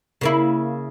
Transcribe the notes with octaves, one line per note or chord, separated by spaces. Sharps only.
C#3 A#3 E4